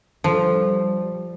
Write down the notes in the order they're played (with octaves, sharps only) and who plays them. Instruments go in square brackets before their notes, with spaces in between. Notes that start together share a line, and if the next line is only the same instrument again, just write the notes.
[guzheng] F3 [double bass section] G3